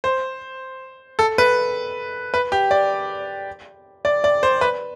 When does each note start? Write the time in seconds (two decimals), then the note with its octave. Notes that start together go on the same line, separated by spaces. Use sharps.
0.04 C5
1.19 A4
1.38 B4
2.34 B4
2.52 G4
2.71 D5
4.05 D5
4.24 D5
4.43 C5
4.61 B4